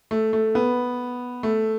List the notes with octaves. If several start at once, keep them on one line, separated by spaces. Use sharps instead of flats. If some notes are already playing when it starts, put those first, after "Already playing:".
A3
A3
B3
A3